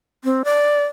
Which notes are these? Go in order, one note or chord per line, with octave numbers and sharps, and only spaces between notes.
C4
D5